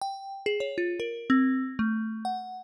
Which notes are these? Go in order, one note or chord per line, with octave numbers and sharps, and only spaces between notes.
G5
G#4
C#5
F4
A#4
C4
A3
F#5